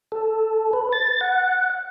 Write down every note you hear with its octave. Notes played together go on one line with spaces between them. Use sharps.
A4
B4
A6
F#5